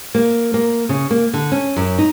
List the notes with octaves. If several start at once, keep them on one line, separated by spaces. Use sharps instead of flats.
A#3
A#3
C#3
A#3
D3
C#4
F#2
D#4